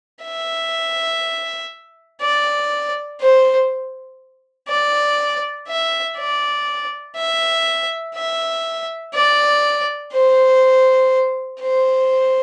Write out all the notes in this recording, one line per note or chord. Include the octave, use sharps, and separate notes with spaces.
E5
D5
C5
D5
E5
D5
E5
E5
D5
C5
C5